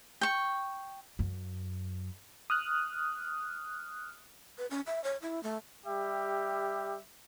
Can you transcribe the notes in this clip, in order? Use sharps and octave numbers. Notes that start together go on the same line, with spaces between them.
G5 C#6
F#2
D#6 F6 F#6
B4
C#4
E5
C#5
E4
A3
G3 G4 E5